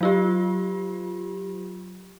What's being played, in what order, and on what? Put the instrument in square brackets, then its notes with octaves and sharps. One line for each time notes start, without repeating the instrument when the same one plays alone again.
[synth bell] F#3 F4 G4